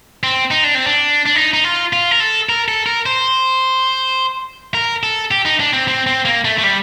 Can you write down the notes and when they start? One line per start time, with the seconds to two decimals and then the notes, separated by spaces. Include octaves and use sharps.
0.23 C4
0.51 D#4
0.64 D4
0.75 C4
0.87 D4
1.26 D4
1.36 D#4
1.53 D#4
1.64 F4
1.93 F4
2.11 A#4
2.20 A4
2.49 A#4
2.68 A4
2.86 A#4
3.06 C5
4.74 A#4
5.03 A4
5.31 G4
5.45 D#4
5.60 D4
5.73 C4
5.88 C4
6.07 C4
6.25 A#3
6.45 A3
6.58 A3
6.63 G3